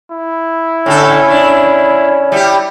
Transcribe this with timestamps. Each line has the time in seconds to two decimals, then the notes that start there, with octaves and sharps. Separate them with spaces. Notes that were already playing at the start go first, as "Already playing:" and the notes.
0.11 E4
0.86 A2 D3 C#4 A4
1.30 D4
2.32 G3 E4 G4